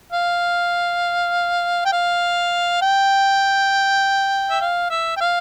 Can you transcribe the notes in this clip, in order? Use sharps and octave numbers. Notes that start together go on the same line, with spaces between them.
F5
G5
F5
G5
E5
F5
E5
G5
F5